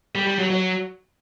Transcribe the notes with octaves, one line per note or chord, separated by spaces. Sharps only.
G3
G3
F#3
F#3